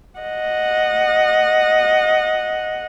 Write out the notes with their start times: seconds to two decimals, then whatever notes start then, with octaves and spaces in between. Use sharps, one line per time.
0.20 D#5 F#5